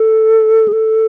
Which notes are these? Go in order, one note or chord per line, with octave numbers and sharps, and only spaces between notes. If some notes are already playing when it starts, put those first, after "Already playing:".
Already playing: A4
G#4
A4